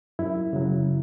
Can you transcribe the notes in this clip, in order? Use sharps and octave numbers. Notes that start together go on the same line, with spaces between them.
F#2 E4
C#3 F#3